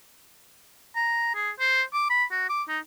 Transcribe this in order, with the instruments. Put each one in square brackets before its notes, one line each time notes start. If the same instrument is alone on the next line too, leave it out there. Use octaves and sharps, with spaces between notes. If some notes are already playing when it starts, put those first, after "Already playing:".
[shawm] A#5
G#4
C5
D6
B5
F#4
D6
D#4